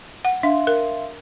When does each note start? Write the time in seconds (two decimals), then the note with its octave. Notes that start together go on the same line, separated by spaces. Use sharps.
0.25 F#5
0.43 D4 E5 F5 C6
0.67 A#4